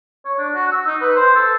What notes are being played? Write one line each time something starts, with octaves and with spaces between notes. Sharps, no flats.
C#5
D4
F#4
E6
D#4
B4
C5
A4